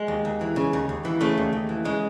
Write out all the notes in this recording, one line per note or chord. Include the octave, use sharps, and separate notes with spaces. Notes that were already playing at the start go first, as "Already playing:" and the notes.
Already playing: G#3
D#2
D#2
E3
C#3
D#2
D#2
E3
C#3 A3
D#2
D#2
E3
C#3 G#3